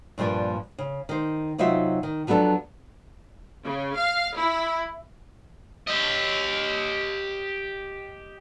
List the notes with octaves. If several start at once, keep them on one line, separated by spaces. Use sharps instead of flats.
G2 A#2 F3 A#3 D4
C#3
D#3 C5
C3 F#3 D#4 F4 F#4 E5
D#3
F3 F#3 B3 D4 A4
C#3
F5
E4
G4 D#5